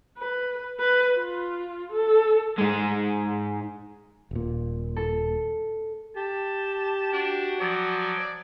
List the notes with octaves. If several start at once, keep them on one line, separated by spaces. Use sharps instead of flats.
B4
B4
F4
A4
G#2 G#3
D#1 A#2
A4
G4 A5
D4 F#4
F3 F#3 D5